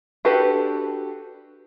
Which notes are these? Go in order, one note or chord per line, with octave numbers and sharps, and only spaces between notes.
D4 F#4 G4 A4 B4